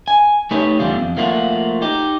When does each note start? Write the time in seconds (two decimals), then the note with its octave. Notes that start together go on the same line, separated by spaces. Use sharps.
0.08 G#5
0.51 A3 D#4 G4 B4 C#5
0.79 E2 D3 G3 F4
1.00 F2
1.17 F3 A3 A#3 F4 F#4
1.82 D#4 G4